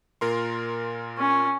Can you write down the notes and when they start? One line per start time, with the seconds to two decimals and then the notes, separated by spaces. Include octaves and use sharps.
0.21 A#2 A#4 C6
1.18 C#4